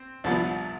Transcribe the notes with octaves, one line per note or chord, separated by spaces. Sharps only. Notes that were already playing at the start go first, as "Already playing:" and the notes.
Already playing: C4
C2 C3 F3 B3 D4